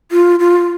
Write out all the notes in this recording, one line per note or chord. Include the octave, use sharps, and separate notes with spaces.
F4
F4